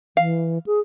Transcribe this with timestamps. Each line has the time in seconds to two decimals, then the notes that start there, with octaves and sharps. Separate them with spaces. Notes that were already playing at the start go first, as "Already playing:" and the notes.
0.17 E3 F5
0.66 G#4